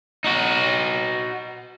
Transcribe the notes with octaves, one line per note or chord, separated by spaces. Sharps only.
D#4 F#4